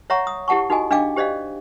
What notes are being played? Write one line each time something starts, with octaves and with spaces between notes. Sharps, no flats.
C#5 E5 F#5 A#5 C#6
D#6
E4 G4 F#5 A5 C#6
D#4 F#4 A4 D#5 G#5
D4 D#5 F5 G5 D6
G4 C5 D5 D#5 F5